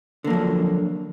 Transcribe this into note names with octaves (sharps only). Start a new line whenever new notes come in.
D3 F3 F#3 A#3